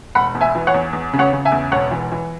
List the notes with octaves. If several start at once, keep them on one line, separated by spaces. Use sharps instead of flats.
E1 F#5 B5
E2
E5 G#5
E3
C#5 F#5
E2
E2
C#3
C#5 F#5
C#3
E5 G#5
E2
E1 C#5 F#5
E3
E3